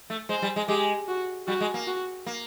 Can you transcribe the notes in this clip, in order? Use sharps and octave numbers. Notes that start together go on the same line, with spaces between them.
A3
G#3 C5
G3
G#3
G#3 G4
F#4
G3 F#4
G#3
A#3
F#4
A#3